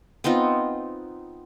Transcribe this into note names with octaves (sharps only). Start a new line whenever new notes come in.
B3 C4 D#4 F4